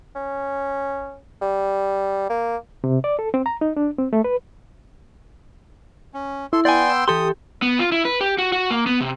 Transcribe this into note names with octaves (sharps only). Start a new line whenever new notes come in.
C#4
G3
A#3
C3
D5
A4
C4
A#5
D#4
D4
C4
A3
B4
C#4
E4 A4 C6
B3 D5 G5 G#5 C6
E6
E3 G4 A4 C6 D#6
B3
F4
E4
B4
G4
F#4
F#4
A#3
B3
C3